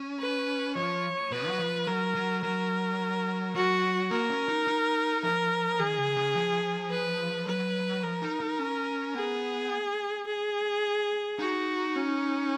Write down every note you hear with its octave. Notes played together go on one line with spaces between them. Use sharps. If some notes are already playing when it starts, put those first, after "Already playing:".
Already playing: C#4
B4
F3 C#5
B2 B4
F#3
F3
F#3 A#4
F#3
F#3 A#4
F#3 F#4
A#3 A#4
C#4
D#4
D#4
F3 A#4
D#3 G#4
C#3
C#3
F3
B4
F#3 B4
F3 A#4
D#4
D#4
C#4
B3 G#4
G#4
D#4 F#4
C#4